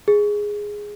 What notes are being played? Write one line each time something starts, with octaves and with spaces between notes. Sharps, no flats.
G#4